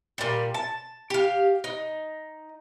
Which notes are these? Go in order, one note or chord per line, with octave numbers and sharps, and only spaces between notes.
A#2 G3
A5
G4 F5
D#4